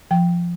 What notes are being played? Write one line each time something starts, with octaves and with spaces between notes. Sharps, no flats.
F3 G5